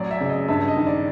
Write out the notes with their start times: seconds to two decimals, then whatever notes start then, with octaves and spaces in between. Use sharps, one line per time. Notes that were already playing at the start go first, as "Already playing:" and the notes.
Already playing: A1 F#3 D5
0.11 E5
0.21 C#3 D5
0.29 D#5
0.48 G2 E5
0.68 D#5
0.76 D#3
0.87 D5